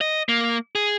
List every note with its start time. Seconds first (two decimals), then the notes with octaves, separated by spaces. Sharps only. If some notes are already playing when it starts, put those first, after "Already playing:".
0.01 D#5
0.29 A#3
0.75 G#4